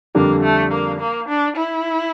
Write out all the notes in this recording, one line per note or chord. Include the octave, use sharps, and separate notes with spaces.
F2 D3 G3 A#3 D4 G4
A3
A#3
A#3
D4
E4